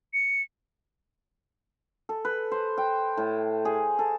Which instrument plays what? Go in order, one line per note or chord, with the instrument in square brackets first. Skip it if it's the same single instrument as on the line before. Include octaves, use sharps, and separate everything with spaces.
[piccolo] C#7
[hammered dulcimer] A4
B4
C5
G5
A2
G#4
A4